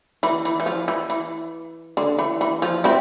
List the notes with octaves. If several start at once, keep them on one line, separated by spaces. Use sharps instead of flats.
E3
E3
E3
F3
E3
E3
D3
E3
E3
F3
C4 E4